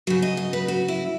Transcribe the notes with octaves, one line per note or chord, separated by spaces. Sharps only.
C#3 F#3 F#4
D#5
D#5
B4
F#4
E4